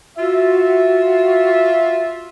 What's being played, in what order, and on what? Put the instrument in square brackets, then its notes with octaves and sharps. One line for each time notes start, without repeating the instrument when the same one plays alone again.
[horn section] F4 E5 [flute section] F#4